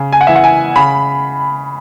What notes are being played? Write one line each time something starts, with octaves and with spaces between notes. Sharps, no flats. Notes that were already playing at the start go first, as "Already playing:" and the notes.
Already playing: C#3
G#5
F#5
E3 E5
F#5
G#5
C#3 B5